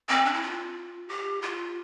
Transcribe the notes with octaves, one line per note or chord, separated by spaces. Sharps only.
C4
D4
E4
F4
G4
F4